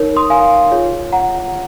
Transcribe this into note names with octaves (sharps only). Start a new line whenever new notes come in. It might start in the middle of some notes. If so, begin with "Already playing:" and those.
Already playing: D#4 A#4 C#5
C6 D#6
F5 G#5
F4 G#4 C#5
F#5 A#5